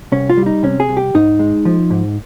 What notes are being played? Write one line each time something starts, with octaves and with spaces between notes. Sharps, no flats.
C2 C#4
F4
G3
D#4
C3 C#4
G#4
C2
G4
G#2 D#4
G#3
F3
G#2